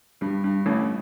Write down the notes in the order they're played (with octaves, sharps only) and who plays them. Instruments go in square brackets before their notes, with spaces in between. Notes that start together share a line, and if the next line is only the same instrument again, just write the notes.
[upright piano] G2 [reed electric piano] G3
[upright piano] G2
[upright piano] A1 [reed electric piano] A3